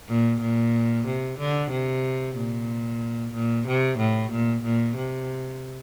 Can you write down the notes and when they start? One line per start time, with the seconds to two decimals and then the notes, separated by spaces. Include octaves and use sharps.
0.09 A#2
0.41 A#2
1.06 C3
1.39 D3
1.71 C3
2.36 A#2
3.33 A#2
3.67 C3
3.99 A2
4.32 A#2
4.64 A#2
4.97 C3